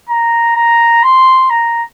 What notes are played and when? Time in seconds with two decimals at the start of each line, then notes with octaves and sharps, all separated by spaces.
0.09 A#5
0.56 A#5
1.03 C6
1.50 A#5